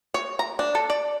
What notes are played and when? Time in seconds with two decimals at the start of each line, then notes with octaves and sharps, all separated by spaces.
0.14 C#5
0.39 A#5
0.59 D4
0.75 A4
0.90 D5